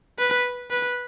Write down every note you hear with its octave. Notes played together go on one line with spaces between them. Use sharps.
B4
B4